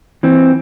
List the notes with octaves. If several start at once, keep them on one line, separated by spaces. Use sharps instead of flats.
E3 C4